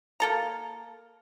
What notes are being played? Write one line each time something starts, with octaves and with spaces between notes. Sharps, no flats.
A#3 A4 A#5